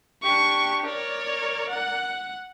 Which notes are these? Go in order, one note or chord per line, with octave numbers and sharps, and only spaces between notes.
D4 G4 C#6
A#4 C#5 D5
F#5